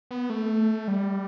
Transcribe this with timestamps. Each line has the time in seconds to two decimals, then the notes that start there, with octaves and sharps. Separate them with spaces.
0.11 B3
0.30 A3
0.88 G3